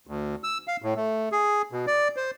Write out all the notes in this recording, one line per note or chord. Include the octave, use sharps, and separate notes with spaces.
D2
E6
F5
A2
A3
G#4
B2
D5
C5